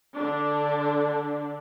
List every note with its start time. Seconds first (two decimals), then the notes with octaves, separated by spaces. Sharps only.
0.16 D3 D4